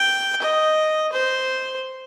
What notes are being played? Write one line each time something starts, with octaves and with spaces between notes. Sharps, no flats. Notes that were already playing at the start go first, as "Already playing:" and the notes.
Already playing: G5
D#5
C5